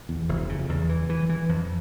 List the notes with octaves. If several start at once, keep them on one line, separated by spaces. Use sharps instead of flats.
E2
F1
C#3
E2
E3
E3
E3
F2